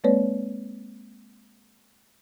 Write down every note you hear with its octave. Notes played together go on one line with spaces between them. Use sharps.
G#3 A#3 C4 B4 C#5 D5